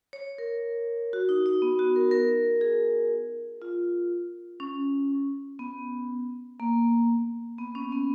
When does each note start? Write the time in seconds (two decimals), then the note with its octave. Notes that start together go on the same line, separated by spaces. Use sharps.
0.13 C#5
0.38 A#4
1.13 F#4
1.29 D#4
1.46 D#4
1.62 B3
1.79 F#4
1.96 A#4
2.11 A#4
2.61 G#4
3.62 F4
4.60 C#4
5.59 B3
6.60 A#3
7.58 B3
7.75 C#4
7.92 B3